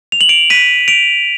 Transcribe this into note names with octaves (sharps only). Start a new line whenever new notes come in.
F7
F#7
D7 F7
B6 D#7
D7 F7